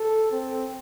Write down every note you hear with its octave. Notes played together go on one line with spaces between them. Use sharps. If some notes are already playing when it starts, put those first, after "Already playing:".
Already playing: A4
C4